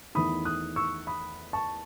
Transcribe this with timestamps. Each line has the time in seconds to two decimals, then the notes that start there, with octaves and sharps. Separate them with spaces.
0.15 E2 D#3 A3 E4 B5 D#6
0.45 D#6 F#6
0.76 C#6 E6
1.07 B5 D#6
1.53 A5 C#6